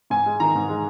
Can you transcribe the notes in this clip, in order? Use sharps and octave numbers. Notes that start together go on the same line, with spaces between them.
G#2 G#5
G#3
D#3 A#5
G#2
G#3